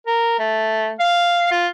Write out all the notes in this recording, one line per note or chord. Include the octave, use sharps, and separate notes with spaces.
A#4
A3
F5
F4